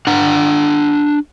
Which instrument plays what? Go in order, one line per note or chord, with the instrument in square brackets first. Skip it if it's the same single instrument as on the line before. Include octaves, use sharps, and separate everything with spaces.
[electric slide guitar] D4 F#5 A#5